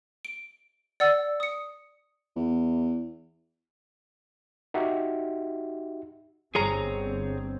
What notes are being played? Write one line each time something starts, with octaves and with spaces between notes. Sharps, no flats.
D7
D5 F#5 E6 A6
D#6 C#7
E2
D#4 F#4 G4 E5
G1 C4 G#4 C#5 A#5